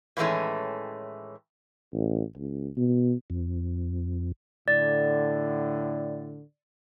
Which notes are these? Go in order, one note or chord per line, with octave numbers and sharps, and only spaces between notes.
A2 D#3 E3 G#3 A3 C#4
A1
C#2
B2
F2
A2 D3 D5 A6